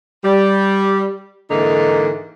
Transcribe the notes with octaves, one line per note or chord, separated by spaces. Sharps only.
G3
G#2 D3 E3 A#3 D#4